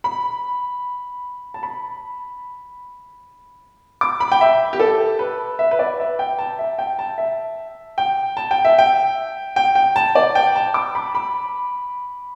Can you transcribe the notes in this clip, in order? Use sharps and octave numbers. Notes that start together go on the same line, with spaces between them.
B5
A5
B5
D6
B5
G5
E5
G4
A4
B4
E5
B4
D5
E5
G5
A5
E5
G5
A5
E5
G5
A5
G5
E5
G5
G5
G5
A5
D5
G5
A5
D6
B5
B5